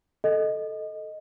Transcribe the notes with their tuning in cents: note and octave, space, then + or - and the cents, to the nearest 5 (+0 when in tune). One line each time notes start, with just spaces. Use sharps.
A4 +0 D#5 +0